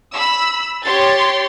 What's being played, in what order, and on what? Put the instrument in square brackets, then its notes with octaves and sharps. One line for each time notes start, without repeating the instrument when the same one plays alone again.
[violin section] B5 E6
G4 C#5 C6 A6